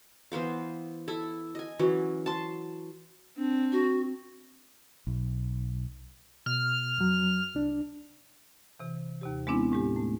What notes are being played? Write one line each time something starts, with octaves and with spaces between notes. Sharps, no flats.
E3 B3 C5 F5
E4 A4
D#5 G#5
E3 F#3 C#4
A5 C6
C4 D4
F#4
B1
B2 F6
F2 F#3
C2 D4
C3 E3
D#2 C3 G4
G#3 B3 C4 D4 E4
A2 G#3 G4
A3